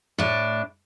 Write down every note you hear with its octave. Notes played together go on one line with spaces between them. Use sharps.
A2 D4